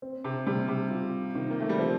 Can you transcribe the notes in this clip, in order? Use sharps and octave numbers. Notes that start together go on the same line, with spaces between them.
C4
C3
C3 G3
C3
F4
C3 D#3
A#3
A3
G3
F3 C4